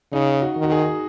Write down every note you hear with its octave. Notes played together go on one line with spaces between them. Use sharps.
C#3 D#4
F#4
D#3
F#4
G#4